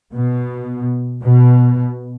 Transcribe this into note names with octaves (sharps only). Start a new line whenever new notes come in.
B2
B2